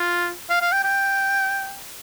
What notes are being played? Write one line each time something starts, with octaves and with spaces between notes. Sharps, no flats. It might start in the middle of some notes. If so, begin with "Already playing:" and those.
Already playing: F4
F5
F5
G5
G5